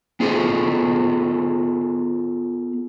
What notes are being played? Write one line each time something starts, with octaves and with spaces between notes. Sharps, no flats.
B3 F4 G#4 A4 C5